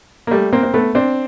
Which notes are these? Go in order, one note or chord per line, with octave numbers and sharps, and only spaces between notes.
A#3
G3 A3
A#3 C4
C4
A3 B3
C4 D4